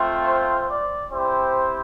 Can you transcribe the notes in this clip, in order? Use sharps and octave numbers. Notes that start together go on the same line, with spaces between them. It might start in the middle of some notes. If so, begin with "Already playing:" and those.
Already playing: A3 C4 F4
C5
D5
C4 E4 G4 C5